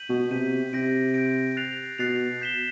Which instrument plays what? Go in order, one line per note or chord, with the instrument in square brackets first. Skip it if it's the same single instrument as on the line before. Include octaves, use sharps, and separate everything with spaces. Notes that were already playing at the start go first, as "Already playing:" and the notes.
Already playing: [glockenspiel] G6 B6 D#7 F#7
[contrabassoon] B2
[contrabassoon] C3 [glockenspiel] G6 B6 D#7 F#7
[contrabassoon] C3 [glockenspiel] G6 A#6 D7
[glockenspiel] G6 A#6 D7
F#6 A6 C7 F7
[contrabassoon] B2 [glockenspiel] F#6 A6 C7 F7
[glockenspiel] G6 B6 E7 G7